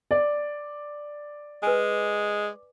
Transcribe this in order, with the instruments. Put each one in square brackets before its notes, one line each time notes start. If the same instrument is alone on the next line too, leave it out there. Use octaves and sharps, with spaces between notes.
[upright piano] D5
[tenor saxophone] G#3 [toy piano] B4 G#5